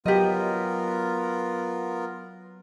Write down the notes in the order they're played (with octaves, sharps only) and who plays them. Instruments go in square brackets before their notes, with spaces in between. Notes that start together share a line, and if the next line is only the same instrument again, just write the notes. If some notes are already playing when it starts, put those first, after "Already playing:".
[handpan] F#3 [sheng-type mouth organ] B3 F4 A#4 [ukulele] G4 D#5